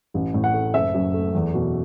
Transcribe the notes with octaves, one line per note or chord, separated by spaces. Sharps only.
A1
A2
F#5
A3
F#1 E5
F#2
A3
E2
B2